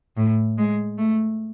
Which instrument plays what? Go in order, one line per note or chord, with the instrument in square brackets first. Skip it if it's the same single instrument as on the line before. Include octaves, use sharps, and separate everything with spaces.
[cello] A2
G#3
A3